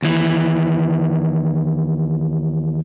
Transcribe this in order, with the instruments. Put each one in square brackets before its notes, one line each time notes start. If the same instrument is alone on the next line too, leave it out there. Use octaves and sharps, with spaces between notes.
[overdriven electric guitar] D#2 E3